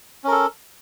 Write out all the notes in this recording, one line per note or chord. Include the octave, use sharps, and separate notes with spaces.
C#4 A4 A#4